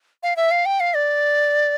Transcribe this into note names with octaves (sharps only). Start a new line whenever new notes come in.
F5
E5
F5
G5
F5
D5